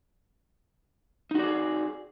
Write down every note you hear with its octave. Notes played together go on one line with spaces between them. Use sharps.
D#4 F#4 G#4 D5